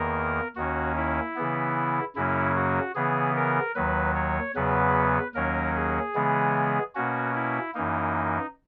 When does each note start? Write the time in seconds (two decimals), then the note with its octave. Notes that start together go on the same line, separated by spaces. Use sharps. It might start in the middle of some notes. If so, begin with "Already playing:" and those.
Already playing: E2 D#3 A#3 A#4
0.56 D#2 D#3 A#3 C#4 F#4
0.97 E4
1.36 C#3 E3 B3
2.16 F#2 C#3 F#3 A#3 C#4 E4
2.56 F#4
2.95 C#3 E3 B3 G#4
3.36 A#4
3.75 D#2 D#3 F#3 B4
4.16 C#5
4.55 E2 C#3 F#3 B3 B4
5.35 D#2 D#3 F#3 A#3 C#4 A#4
5.76 G#4
6.15 C#3 E3 G#3 B3
6.95 B2 A#3 C#4 F#4
7.35 E4
7.74 F#2 E3 A#3 D#4